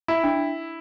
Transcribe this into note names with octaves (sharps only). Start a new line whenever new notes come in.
E4
D4